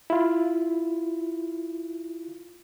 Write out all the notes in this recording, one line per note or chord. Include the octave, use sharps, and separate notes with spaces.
E4 F4